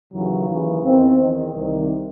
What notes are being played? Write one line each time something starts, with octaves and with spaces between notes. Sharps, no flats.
D#2 C#3 E3 F#3
D#2 C#3 E3
E2 D#3 C4
E2 D#3 D#4
C2 C3 D#3